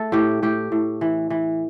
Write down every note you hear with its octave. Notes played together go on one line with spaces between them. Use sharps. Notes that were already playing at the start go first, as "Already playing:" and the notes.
Already playing: A3 A4
A2 G4
A2 G4
A2
E3
E3